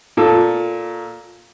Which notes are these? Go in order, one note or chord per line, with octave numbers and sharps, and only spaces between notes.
A#2 A4